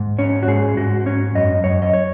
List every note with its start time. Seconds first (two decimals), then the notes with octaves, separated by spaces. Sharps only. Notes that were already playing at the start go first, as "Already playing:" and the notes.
Already playing: G#2
0.19 C#4 C#5
0.43 F#4
0.48 G#2 G#4
0.77 G#2 F#4
1.06 C#4 C#5
1.35 F#2 D#5
1.64 F#2 C#5
1.82 D#5
1.93 C#5